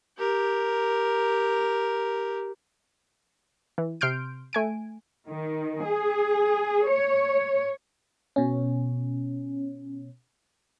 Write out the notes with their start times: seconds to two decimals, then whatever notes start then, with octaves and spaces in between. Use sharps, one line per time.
0.18 G4 A#4
3.78 E3
4.01 C3 C6 F6 G6 D7
4.53 A3 G#5 D7
5.30 D#3
5.85 G#4
6.89 C#5
8.36 B2 C#4